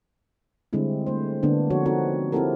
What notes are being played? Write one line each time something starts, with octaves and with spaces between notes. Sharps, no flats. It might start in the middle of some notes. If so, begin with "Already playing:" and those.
D3 G3 G#3 C4 E4
A3 C5
D3 A#3 B3 D4
F3 C4 F#4 C#5
C4 D#4 F#4 A4
C4 E4 F#4 G4 A4 A#4